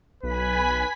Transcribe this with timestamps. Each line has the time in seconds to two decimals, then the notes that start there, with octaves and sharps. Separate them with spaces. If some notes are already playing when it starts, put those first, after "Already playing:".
0.23 B1 B4 G#5 B5 B6